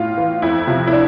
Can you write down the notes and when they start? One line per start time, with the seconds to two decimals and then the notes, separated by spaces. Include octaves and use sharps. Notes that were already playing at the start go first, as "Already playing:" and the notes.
Already playing: A2 F4
0.18 E3
0.42 F2 E4
0.67 C3 F3
0.87 E4
0.93 D4